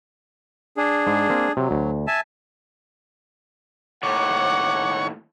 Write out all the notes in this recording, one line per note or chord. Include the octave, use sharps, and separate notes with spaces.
D4 G#4
G#2
A#3 C4
C3 F#3
D2
E5 G#5 A5
D#2 A2 C#5 F#5 D6